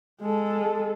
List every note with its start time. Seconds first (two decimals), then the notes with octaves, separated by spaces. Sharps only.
0.22 G#3 A4